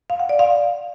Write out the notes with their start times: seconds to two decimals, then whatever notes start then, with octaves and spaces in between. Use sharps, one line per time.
0.10 F5
0.20 F#5
0.29 D5
0.39 F5